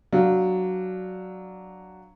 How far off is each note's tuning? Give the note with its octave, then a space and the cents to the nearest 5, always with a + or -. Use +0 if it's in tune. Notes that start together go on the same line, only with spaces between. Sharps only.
F#3 +5 D4 +0 F5 +0